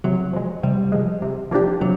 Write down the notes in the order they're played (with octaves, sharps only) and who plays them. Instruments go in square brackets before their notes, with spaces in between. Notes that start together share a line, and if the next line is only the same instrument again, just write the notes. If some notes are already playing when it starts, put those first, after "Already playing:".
[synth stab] C3 [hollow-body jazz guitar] F#3
[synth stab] F3 G#3
[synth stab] C3 [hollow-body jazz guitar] G3
[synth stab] F3 G#3
C3
F3 A#3 D4 G4
[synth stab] C3 [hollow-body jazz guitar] F#3